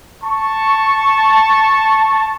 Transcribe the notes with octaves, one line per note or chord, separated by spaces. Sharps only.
A5 C#6